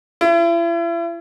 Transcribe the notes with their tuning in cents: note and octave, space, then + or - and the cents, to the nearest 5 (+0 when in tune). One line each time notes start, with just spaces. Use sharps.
E4 +40